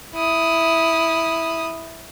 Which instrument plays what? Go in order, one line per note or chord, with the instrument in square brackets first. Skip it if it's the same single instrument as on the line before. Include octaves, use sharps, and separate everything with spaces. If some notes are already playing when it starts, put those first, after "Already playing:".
[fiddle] E4 D#6